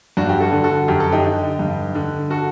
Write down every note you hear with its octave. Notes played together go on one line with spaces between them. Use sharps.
G2 D4 F#4
G4
F#4 A4
D3
F#4 A4
F#2 G4
A4
D#4 G4
D3
G2
D3
F#4 A4